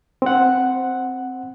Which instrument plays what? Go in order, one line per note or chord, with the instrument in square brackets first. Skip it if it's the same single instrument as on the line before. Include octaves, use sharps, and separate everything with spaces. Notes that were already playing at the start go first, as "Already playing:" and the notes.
[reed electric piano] C4 F#5